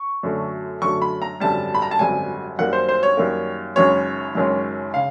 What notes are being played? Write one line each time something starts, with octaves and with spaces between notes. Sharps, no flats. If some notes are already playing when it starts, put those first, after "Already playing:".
Already playing: C#6
F#2 D3 F#3 A3
F#2 D3 F#3 A3 C#6
B5
A#5
G#1 F#2 D3 G3 A5
B5
A#5
A5
G#1 F#2 D3 G3 G#5
F#2 D#3 G3 A#3 F#5
C5
C5
C#5
F#2 D#3 G3 A#3
F#1 F#2 D#3 G#3 C#4 C#5
F#1 F#2 D#3 G#3 C#4
C#3 F5